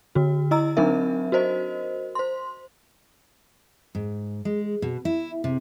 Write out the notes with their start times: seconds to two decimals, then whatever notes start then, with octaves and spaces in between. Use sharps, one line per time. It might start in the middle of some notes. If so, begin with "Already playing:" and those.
0.15 D3 F#4
0.51 E4 D#5 A#5 E6
0.77 F#3 C4 D4 D#4 A#4 E5
1.32 F#4 A#4 C5 D#5
2.15 C5 C6
3.95 G#2
4.45 G#3
4.82 B2
5.05 E4
5.44 C3